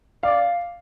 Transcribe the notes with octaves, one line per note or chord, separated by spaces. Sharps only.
D5 F5